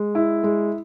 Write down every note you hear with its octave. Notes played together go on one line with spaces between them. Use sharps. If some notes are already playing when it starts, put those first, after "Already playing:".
Already playing: G#3
E4
G#3